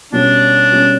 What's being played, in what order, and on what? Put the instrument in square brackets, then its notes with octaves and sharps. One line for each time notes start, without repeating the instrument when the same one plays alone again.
[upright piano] B2 G3 C#4 [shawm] D4
[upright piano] B2 G3 C#4